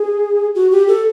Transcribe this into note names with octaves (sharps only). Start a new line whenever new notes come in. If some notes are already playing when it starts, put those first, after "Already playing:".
Already playing: G#4
F#4
G4
A4